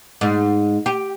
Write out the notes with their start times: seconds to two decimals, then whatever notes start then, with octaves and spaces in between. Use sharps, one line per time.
0.21 G#2
0.86 G4